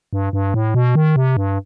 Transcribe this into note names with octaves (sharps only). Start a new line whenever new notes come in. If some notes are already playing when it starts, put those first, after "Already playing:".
G2
G2
A2
B2
D#3
C3
G2